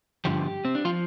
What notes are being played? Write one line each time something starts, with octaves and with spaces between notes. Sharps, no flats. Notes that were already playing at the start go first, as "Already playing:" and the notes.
G2 D3 F3 G4
C4
D4
F3 F4